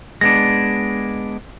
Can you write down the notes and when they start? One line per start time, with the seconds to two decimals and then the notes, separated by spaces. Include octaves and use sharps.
0.21 G#3 B3 D4 A#6